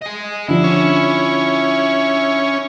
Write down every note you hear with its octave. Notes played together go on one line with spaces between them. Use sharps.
D#5 G#5
D3 F3 D4 E4
C#4